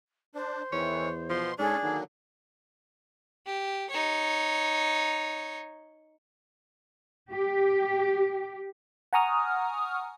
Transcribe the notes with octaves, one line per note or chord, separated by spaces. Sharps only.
D4 C5
E2 D#3 E3 C#5
B2 F3 C6
G#2 C#4 D4 G#4 A4
D3 D#3 F#3 A#3
G4
D#4 C#5
G4
F#5 G#5 A#5 C#6 D#6 F6